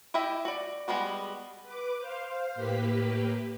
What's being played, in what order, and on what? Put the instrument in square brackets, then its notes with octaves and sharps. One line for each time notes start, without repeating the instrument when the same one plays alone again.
[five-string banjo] E4 G4 D#5 E5 G5
F#4 D5
G3 G#3 B3 F#4
[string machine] B4 D6
C5 F5
A2 A#3 G4 B4 B6